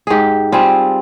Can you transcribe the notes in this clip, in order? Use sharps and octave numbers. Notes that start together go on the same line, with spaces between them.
G#2 G4 G#4
G3 C4 F4 G#4